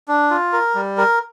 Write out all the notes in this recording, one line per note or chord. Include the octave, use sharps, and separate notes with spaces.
D4
F4
A#4
G3
A#4